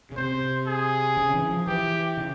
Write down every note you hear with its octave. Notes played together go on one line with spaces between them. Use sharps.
C#3
C3 C5
G#4
C#3
E3
F3
E3 G4
C#3